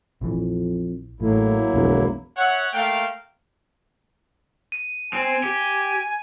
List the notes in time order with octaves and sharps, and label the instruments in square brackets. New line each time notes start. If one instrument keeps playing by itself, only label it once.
[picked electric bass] A#1 E3 [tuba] F2
[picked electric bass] A1 [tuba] A2 [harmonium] F#3 A#3 E4
[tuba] E1 [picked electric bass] B1 F2 D3
[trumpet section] C#5 E5 F#5
A3 A#3 F5 G5
[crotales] D#7
[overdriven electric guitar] C4 [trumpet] G#5
[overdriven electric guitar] G4